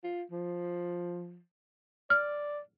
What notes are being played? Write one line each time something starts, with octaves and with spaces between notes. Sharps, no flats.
F4
F3
D5 F6